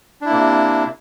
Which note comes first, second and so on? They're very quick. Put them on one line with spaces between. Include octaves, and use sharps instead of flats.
D4 E4 A#3 C3